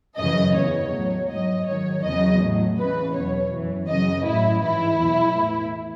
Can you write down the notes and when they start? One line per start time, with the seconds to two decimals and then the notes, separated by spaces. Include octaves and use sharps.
0.18 F#2 C#3 E3 D#5
0.56 E2 C#3 E3 C#5
0.92 A2 F#3
1.29 G#2 F#3 D#5
1.67 G#2 D#3 F#3 C#5
2.03 E2 C#3 F#3 D#5
2.41 A2 F#3
2.78 E2 C#3 E3 B4
3.15 E2 B2 F#3 C#5
3.52 F#2 E3
3.88 F#2 C#3 F#3 D#5
4.25 A2 F#3 E4
4.62 G#2 E3 E4
5.00 E2 B2 F#3
5.36 A2 E3